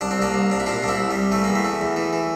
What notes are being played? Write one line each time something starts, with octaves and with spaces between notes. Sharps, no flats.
C2 D4
C4
C2 A#3 D4
C2
C2 D4
E4
A#2 D4 F4
C2 D4
C4 E4
C2
G3
C2
E3 A3
E2 A#3
A3
E3
E2
E3
E3